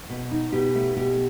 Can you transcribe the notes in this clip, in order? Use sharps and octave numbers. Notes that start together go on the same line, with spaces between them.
B2
D#4
B2 G4
A3
B2 G4